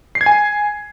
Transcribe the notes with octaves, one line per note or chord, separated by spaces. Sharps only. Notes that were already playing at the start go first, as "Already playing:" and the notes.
C7
G#6
G#5